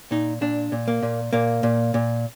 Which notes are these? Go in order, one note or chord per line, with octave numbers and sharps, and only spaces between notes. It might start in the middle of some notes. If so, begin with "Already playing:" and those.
A#2 D#4
A#2 D4
A#2
A#3
A#2
A#2 A#3
A#2
A#2